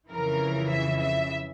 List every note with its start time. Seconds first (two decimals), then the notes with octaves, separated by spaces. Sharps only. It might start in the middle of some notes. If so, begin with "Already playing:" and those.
0.10 F2 C#3 E3 A#4
0.70 E5
1.00 E5